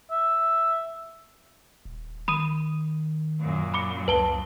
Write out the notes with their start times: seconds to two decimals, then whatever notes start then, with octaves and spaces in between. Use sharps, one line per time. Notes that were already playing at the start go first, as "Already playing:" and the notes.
0.11 E5
1.85 D#1
2.28 D#3 B5 D#6 D#7
3.40 F#2 A#2
3.74 B5 D6 C#7
4.08 C#2 B4 A5 G7